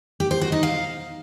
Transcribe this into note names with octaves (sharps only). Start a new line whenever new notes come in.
G4
C5
F#4
D#4
F5